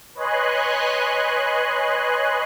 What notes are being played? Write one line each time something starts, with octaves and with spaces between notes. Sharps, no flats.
B4 C#5 D#5 G#5 C6 F#6